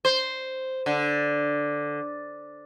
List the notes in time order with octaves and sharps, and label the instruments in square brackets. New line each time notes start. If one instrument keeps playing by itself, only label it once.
[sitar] C5
D3